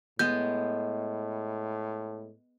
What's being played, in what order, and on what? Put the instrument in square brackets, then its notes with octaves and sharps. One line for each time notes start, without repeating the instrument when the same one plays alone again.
[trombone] A2 [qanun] G#3 B3 [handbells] G6